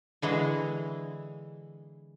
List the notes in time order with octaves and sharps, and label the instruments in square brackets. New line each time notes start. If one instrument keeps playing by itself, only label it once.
[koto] D3 E3 G#3